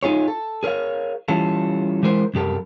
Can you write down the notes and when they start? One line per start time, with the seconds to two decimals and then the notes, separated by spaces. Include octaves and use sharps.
0.03 D#4 F4 G#4 C#5
0.28 A4
0.63 G#4 A#4 C5 C#5 F5
1.28 E3 G3 C#4 F4 A4
2.03 E3 G#3 E4 A#4 C5
2.34 C2 F#2 G4 A4 A#4